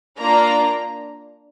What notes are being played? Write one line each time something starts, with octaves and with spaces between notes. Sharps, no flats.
A#3 D4 F4 A#5